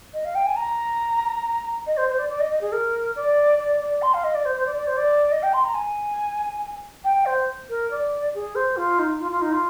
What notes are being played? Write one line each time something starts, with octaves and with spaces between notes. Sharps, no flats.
D#5
F5
G5
G#5
A#5
D#5
C5
C5
D5
D5
D#5
D#5
G#4
A#4
D5
D5
D5
C6
F5
D#5
D5
C5
C5
D5
D5
C5
D5
D#5
G5
C6
A#5
G#5
G5
C5
A#4
D5
G#4
C5
F4
D#4
F4
F4
D#4
F4